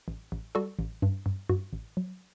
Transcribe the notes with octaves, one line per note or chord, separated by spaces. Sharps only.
A1
A1
G3 F#4 A4
A1
G2
G2
G2 F#4
A1
F#3